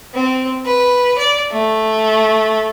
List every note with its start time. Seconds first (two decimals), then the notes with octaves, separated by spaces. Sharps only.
0.14 C4
0.66 B4
1.18 D5
1.51 A3